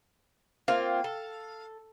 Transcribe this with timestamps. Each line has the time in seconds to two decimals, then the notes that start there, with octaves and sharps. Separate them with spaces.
0.68 A#3 C4 F4 F5
1.04 A4